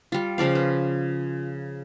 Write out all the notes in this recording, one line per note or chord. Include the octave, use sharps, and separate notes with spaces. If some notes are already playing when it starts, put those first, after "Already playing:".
G3 F4
C#3 F3 D5 F5
B4